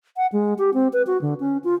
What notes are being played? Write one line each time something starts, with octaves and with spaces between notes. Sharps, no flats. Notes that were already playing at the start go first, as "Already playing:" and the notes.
F#5
G#3
G4
C4
B4
F#4
D3
C#4
F4